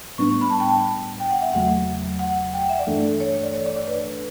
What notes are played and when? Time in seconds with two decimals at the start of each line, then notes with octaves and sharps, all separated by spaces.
0.18 A2 G3 B3 D4 C#6
0.30 C#6
0.41 B5
0.50 A5
0.60 G5
0.69 A5
1.20 G5
1.31 F#5
1.42 E5
1.53 E2 C#3 F#3 A3 F#5
2.19 F#5
2.54 G5
2.62 F#5
2.69 E5
2.79 D5
2.87 G2 E3 A3 D4 A4
3.20 C#5
3.43 D5
3.54 C#5
3.66 D5
3.76 D5
3.87 B4